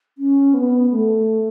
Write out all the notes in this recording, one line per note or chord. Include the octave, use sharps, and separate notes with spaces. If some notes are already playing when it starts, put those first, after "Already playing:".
C#4
B3
A3